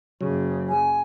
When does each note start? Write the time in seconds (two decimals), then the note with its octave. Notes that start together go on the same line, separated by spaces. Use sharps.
0.21 F#1 C#3 F#3
0.68 G#5